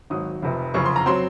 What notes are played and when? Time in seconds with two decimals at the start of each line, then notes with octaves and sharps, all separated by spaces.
0.10 G#1 G#2 F#3 D#6
0.42 F1 F2 C3
0.74 F#1 F2 C#3 C#6
0.85 C6
0.96 A#5
1.06 F#3 C4 C6